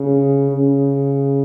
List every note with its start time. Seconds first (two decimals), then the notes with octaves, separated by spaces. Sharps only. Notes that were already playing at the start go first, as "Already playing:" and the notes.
Already playing: C#3
0.50 C#3